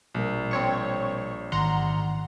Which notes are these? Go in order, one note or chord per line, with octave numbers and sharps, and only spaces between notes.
A#1 B2 G3 A#4
C4 C#5 C#6
A1 G#2 D#3 F#5 A#5 C6